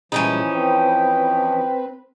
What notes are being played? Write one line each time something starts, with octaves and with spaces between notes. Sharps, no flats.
A#2 E3 F3 G3 G#3 C#4 D#4
C4 B4 G5